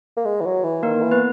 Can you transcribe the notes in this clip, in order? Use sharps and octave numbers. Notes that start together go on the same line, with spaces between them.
A#3
G#3
E3
F#3
E3
D#3 A#3 A#4
E3
B3 B4